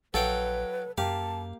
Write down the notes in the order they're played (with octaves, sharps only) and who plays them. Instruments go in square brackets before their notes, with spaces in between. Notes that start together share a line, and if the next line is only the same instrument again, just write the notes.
[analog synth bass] A#1 [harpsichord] F#3 F5 G5 [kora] A4 [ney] B4
[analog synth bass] F#2 [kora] A#3 G4 [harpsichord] F5 [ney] A5